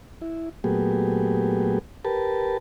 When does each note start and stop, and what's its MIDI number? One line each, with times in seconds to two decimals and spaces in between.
0.21 0.49 64
0.64 1.79 46
0.64 1.79 54
0.64 1.79 57
0.64 1.79 59
0.64 1.79 67
0.64 1.79 68
2.05 2.57 67
2.05 2.57 70
2.05 2.57 71
2.05 2.57 81